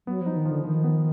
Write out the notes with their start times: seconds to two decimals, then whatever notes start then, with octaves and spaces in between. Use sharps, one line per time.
0.07 F#3 B3
0.21 F3
0.26 D#4
0.36 D#3
0.46 D3 F3
0.65 D#3 F3
0.84 B3